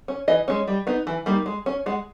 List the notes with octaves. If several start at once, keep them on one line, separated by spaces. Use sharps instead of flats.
C#4
E3 D#5
G#3 C#4
G3
B3 D#4
E3
G3 A#3 D#4
G#3
C#4
G#3 F#5